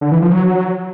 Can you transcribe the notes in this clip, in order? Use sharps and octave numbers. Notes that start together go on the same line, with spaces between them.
D3
E3
F3
F#3